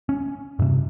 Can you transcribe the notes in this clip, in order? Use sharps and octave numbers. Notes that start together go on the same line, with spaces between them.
C#4
G2 C3